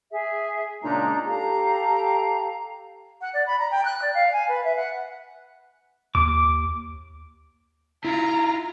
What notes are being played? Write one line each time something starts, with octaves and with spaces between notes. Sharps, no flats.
G#4 E5
A#2 C#3 G#3 D4 D#4 A#5
G4 A4 F5 A#5
F#5
D5
B5
A#5
G5
F#6
D5
F5
G#5
B4
E5
F#5
D#2 D6
E4 F4 A#5